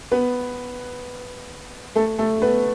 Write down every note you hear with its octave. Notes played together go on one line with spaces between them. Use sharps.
B3 B4
A3 A4
A3 A4
B3 B4